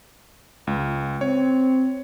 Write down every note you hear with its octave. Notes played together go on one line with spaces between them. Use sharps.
C#2
C4 C#5